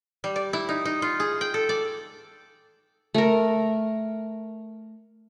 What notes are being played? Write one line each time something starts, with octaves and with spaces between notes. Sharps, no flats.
G3
D5
E4
D#4
D#4
F4
G#4
G5
A4
D5
A3 A#4